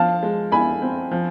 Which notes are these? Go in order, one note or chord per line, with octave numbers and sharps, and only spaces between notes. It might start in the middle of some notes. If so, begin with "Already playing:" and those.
Already playing: F3 F5 A5
G#3
E4 G#5 B5
C4
F3